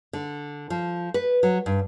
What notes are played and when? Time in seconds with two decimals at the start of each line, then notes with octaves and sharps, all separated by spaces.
0.13 D3
0.70 F3
1.14 B4
1.43 F#3
1.66 G2